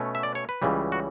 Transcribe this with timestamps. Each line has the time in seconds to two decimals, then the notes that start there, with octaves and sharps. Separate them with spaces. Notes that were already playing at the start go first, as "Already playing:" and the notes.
Already playing: B2 A3 C#4
0.15 E5
0.23 D5
0.35 C#5
0.49 B4
0.62 C#2 C#3 E3 G3
0.92 F#4